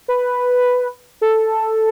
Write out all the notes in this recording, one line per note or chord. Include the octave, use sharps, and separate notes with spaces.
B4
A4